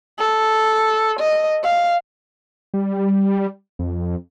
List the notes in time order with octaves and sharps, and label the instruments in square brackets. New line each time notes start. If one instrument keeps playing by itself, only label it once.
[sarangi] A4
D#5
F5
[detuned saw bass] G3
F2